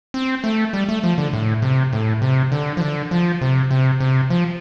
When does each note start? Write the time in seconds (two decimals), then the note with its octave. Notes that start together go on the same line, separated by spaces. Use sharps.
0.14 C4
0.44 A3
0.73 G3
0.89 A3
1.03 F3
1.18 D3
1.33 A2
1.62 C3
1.93 A2
2.22 C3
2.52 D3
2.77 F3
2.81 D3
3.11 F3
3.41 C3
3.71 C3
4.00 C3
4.30 F3